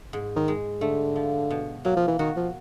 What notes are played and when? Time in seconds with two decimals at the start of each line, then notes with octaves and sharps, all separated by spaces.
0.13 G#2
0.36 D#3
0.48 G#3
0.81 D3 A3
1.16 F3
1.51 B2
1.85 F#3 A#3
1.97 F3
2.08 E3
2.19 D#3 F#4
2.36 F3